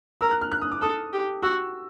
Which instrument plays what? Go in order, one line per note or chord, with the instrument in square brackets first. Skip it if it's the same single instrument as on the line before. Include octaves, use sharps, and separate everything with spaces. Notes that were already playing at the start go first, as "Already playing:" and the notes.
[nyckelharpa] A#4 [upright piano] E6
[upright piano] F#6
F6
F#6
D#6
D6
[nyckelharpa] A4 [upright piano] D#6
[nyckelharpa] G4
[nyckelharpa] F#4 [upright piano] E6